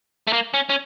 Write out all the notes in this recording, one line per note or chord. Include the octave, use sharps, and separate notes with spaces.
A3
A#3
C#4
C#4